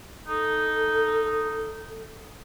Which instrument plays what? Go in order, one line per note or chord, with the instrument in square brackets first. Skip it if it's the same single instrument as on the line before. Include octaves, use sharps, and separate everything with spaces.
[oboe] D#4 [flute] A4